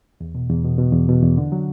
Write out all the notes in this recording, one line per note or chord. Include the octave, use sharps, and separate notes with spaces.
E2
B2
E2
B2
B2
E2
B2
E2
D3
F#3